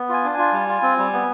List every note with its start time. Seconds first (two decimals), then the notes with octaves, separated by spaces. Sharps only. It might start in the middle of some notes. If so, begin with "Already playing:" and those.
Already playing: B3
0.09 F4 G#5
0.24 D4
0.34 G#5
0.39 F4
0.53 G3
0.69 F4
0.82 C4
0.98 G3
1.13 B3